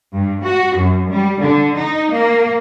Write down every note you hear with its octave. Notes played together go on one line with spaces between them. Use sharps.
G2
F#4
F#2
G3
D3
D#4
A#3